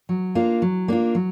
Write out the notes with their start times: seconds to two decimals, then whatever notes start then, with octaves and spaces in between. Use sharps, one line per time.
0.09 F#3
0.35 A#3 D4 F4
0.62 F#3
0.88 A#3 D4 F4
1.15 F#3